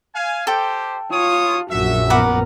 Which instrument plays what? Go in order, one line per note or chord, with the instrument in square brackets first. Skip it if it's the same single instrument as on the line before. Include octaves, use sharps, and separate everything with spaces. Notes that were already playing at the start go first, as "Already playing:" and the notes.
[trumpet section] F5 G#5
[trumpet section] G4 C5 [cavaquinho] A4 G5
[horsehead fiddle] F4 [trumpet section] C#5 D#6
[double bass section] A#1 F#2 A#2 [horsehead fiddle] F#4 [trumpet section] E5
[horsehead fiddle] B3 A#4 [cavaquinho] B4 F#5 D6